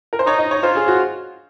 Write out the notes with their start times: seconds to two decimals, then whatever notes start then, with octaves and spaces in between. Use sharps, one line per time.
0.13 A#4
0.19 C5
0.27 D#4 C#5
0.39 D#5
0.51 C#5
0.63 F4 C5
0.75 G#4
0.88 F#4